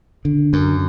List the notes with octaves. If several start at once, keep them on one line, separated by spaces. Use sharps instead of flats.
D3
F#2